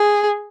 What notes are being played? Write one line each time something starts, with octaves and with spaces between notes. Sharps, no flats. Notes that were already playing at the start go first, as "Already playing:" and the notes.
Already playing: G#4